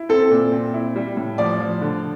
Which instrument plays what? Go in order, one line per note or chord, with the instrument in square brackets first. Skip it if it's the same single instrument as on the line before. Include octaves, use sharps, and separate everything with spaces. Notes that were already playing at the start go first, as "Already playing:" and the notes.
Already playing: [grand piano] E4
[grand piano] C4 [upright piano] A4
[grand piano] A#2
C4
E4
G3
A2
[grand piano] F3 [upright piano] D5
[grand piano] F3
D3